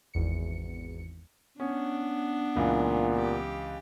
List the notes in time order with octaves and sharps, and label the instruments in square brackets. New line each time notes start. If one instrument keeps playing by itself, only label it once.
[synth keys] G#1 E2 C#7
[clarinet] B3 [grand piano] C#4 [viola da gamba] D4
[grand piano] C#2 E3 [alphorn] A#2
[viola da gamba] G4